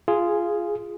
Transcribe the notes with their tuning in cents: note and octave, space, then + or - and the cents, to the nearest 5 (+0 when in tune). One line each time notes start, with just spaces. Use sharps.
F4 -10 G#4 +0